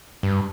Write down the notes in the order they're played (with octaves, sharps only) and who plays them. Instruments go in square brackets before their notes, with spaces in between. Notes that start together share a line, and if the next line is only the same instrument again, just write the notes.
[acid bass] G2